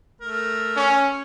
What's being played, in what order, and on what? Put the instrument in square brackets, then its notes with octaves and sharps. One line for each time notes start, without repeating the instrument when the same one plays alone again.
[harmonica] A3 A#4
[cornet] C#4